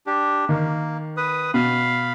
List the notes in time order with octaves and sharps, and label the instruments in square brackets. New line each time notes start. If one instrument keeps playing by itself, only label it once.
[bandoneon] D4 G4
[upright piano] D#3 [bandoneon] A#3
[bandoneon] B4 D#6
[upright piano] B2 [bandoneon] F5 B5